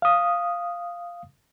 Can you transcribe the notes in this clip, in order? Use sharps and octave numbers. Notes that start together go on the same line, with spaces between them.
F5 D#6